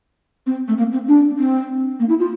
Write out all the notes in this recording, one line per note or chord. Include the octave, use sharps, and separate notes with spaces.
C4
A3
A#3
C4
D4
C4
A#3
E4
F4